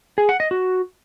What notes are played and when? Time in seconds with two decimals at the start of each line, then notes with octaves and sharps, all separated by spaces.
0.18 G#4
0.29 F#5
0.40 D#5
0.51 F#4